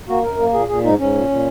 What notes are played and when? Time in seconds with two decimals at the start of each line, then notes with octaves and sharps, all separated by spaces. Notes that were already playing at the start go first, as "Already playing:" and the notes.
0.09 A#3 F#4
0.23 F#2 A#4
0.39 A#3
0.53 A#2 G#4
0.68 A#2 G#4
0.84 G#2 D#4
0.99 G#2 C#4
1.14 A#2
1.29 A#2